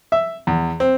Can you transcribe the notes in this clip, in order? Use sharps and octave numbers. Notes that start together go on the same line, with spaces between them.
E5
E2
C4